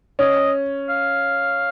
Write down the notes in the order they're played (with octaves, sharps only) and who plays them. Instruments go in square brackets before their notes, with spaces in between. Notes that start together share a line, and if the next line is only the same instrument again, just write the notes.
[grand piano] C#4 [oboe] D#5
[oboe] F5